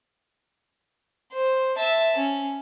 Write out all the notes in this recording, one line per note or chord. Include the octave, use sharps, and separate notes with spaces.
C5
E5 A5
C#4